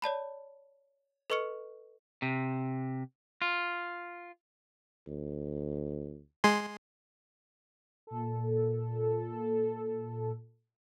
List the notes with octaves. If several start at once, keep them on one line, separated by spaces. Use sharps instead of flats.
C#5 D5 A5 B5
A4 B4 D#5 C#6 F6 C#7
C3
F4
D2
G#3 G#5 C6
A#2 A4